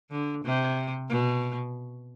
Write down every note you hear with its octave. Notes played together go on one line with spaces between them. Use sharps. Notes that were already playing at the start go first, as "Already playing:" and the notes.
D3
C3
B2